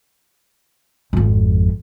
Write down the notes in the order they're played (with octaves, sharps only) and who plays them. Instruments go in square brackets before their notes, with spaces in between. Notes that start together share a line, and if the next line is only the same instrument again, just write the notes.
[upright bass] G#1 F2